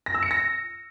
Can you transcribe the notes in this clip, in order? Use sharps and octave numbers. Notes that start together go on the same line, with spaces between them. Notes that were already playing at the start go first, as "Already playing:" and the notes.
A#6
E6
C#7
A#6